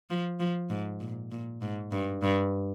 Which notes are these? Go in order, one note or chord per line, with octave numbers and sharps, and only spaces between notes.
F3
F3
G#2
A#2
A#2
G#2
G2
G2